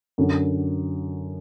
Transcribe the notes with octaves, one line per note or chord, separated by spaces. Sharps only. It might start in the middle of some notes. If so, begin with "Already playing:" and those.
F#2 D3 F#3